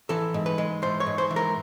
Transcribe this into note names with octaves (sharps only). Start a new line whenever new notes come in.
E3 A4
G#2
B4
G#3
E3 C5
C#5
G#2
C5
E3
A#4